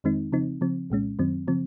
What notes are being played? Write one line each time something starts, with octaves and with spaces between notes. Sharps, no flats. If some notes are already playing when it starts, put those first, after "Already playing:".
F2 D#3 G#3 C4 D#4
C#3 F3 C4 D#4
C#3 F3 C4
C2 A#2 G#3 C#4
F#2 D#3 F#3 C4
C#3 F3 C4